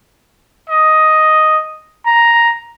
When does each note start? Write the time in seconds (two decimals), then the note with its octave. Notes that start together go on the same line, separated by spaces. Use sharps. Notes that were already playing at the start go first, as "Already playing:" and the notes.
0.69 D#5
2.06 A#5